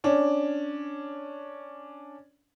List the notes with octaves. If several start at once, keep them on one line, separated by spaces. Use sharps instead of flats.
C#4 D4